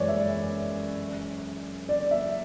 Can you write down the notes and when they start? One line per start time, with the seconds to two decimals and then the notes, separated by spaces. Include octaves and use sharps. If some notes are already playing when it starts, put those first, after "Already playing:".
Already playing: F#2 E3 G#3 B4 C#5 D5
0.08 E5
1.89 D5
2.11 E5